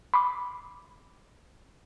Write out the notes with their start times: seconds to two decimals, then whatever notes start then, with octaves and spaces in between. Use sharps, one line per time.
0.14 B5 C6 D6